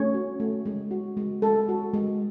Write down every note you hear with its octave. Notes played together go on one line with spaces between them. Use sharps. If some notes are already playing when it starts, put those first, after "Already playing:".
Already playing: A3 C#4 C#5
F#4
A3
G#3
F#4
G#3
G#3 A4
F#4
G#3